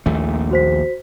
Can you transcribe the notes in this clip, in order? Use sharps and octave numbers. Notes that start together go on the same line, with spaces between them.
A#1 D#2 A3
F#4 C5 B6